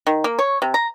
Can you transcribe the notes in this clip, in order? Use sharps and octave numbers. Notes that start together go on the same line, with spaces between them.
D#3
A#3
C#5
C3
A#5